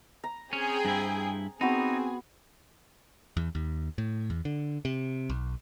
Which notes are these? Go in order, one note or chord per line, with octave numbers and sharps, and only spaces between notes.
A#5
C4 C#4 G#4 G5
G2 E4
B3 C4 D#4 F#4 G#4
E2
D#2
A2
E2
D3
C3
B1